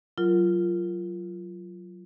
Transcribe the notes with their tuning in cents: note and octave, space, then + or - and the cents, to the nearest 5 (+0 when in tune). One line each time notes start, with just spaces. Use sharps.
F#3 +0 F4 -15 A#4 +0